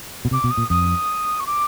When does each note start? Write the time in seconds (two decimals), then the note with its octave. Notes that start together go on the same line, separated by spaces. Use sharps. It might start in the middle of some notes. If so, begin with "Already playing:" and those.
0.25 B2
0.31 C3 D6
0.44 B2
0.50 D#6
0.57 A#2
0.69 F2 D#6
1.39 C#6
1.46 D6